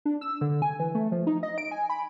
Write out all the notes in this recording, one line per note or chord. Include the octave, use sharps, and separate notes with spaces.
D4
E6
D3
G#5
E3
A3
F3
D#4
D#5
D7
G#5
B5